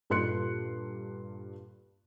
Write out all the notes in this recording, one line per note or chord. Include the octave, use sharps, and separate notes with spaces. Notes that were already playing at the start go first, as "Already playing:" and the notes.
G2 A#2 A4 C6 F#6 C#7